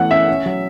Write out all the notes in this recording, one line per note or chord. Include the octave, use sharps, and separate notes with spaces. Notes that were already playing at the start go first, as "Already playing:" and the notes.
Already playing: E3 A3 B3 F#5
C#4 E5
C#4
F#3